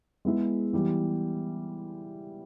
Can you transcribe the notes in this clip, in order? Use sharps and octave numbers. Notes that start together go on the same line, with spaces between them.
G#3 B3 E4 G#4
E3 G3 B3